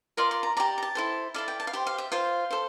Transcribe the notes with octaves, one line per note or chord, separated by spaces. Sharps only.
F4 A#4 D5 C6
C6
A#5
G4 D5 A#5
A#5
A5
E4 A4 C5
E4 A4 D5 F5
G5
A5
F5
G4 C5 G5
F5
E5
F4 C5 F5
A4 C5